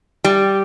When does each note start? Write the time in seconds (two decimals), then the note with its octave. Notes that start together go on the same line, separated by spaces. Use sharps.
0.24 G3